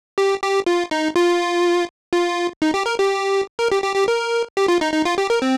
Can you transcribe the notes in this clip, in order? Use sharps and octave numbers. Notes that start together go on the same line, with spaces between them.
G4
G4
F4
D#4
F4
F4
D#4
G4
A#4
G4
A#4
G4
G4
G4
A#4
G4
F4
D#4
D#4
F4
G4
A#4
C4